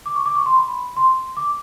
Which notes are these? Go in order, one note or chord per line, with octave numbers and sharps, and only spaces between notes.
D6
C#6
D6
C#6
C6
B5
C6
D6